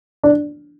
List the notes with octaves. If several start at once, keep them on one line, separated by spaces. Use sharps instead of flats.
D4